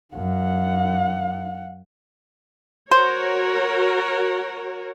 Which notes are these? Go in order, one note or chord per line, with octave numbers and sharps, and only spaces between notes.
F#2 F5 F#5
F#4 A#4 C5 C#5